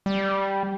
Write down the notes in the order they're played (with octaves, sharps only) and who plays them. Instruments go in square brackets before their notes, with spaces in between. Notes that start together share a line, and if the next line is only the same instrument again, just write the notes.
[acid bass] G3